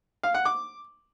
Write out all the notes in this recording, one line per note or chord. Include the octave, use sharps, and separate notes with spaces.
F5
F#5
D6